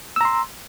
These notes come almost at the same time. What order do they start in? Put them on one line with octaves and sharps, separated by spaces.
E6 A#5 C6